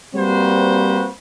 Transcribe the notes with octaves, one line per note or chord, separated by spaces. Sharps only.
G3 A#3 C4 F#4 B4 C5